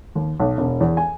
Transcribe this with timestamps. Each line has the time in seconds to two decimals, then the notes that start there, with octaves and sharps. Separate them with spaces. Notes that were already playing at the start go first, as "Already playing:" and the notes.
0.15 D#2
0.40 B1
0.58 E1
0.81 E2
0.97 G#5